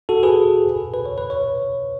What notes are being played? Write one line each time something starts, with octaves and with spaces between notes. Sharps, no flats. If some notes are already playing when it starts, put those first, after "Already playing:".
F#4 A4
G#4 B4
B4
C#5
B4
C#5